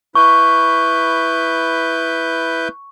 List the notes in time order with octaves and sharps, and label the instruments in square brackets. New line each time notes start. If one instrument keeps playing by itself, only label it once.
[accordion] E4 B4 G6 [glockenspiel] C#6